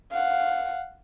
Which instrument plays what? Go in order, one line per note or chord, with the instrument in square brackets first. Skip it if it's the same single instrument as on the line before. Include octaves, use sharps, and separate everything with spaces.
[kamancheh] F5 F#5